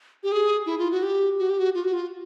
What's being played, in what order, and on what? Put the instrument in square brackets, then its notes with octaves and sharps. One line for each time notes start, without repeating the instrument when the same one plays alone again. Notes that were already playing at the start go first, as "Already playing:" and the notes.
[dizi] G4
G#4
E4
F4
F#4
G4
F#4
G4
F#4
F4
F#4
F4